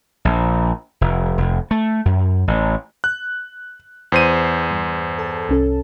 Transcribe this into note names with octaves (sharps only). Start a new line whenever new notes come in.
A#1
F1
F1
A3
F#2
A1
F#6
E2 C5 D#7
G2
A4 A5
C2 C#4 A4